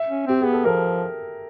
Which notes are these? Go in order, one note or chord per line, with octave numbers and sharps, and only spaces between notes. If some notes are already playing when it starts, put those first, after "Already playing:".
Already playing: E5
C#4
C4 G4
B3 G#4
A4
F3 A#4